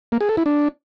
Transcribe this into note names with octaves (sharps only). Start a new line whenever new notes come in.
A#3
G#4
A4
E4
D4